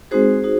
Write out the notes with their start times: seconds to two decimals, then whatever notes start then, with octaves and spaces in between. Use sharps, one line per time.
0.11 G#3 C4 D#4 F#4 G#4 C5
0.44 D#4 F#4